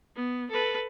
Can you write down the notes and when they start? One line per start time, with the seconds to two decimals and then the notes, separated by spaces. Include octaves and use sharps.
0.16 B3
0.51 A4 B4